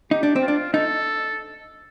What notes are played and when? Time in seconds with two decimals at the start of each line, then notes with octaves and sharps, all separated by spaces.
0.11 D#4 G4
0.23 D4
0.36 C4
0.42 F4
0.48 D4
0.74 D#4 A4